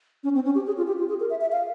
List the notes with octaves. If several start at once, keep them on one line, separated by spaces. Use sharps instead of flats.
C#4
C4
C#4
G4
G#4
F4
G4
F4
G#4
A#4
E5
E5
F5